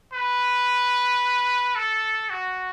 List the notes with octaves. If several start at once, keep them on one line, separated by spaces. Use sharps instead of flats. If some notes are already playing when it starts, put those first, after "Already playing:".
B4
A4
F#4